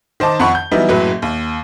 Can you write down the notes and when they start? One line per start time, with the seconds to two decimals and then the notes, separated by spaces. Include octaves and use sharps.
0.20 D#3 C5 D#5 A5 D6
0.40 F2 F#5 B5 C#6
0.55 G6
0.71 E3 F#3 G3 B3 D#4 E4
0.89 F#1 A2 F#3 B4
1.22 D#2